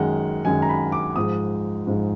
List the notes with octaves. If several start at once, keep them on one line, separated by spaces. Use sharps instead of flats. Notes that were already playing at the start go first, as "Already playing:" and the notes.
Already playing: F#2 D#3 G#3 F#5
F#2 D#3 G#3 G#5
A#5
B5
D6
G#2 F3 G#3 D#6
G#2 F3 G#3